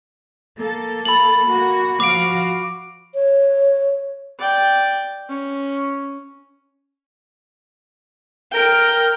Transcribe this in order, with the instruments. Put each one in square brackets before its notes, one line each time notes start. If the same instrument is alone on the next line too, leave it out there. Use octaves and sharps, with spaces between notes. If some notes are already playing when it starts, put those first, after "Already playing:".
[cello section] A#3 A4
[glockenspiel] B5 F#7
[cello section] A#3 F#4
[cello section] F3 F#4 F5 [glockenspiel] D6 D7
[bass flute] C#5
[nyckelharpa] D5 G5
C#4
[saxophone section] A#4 [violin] G5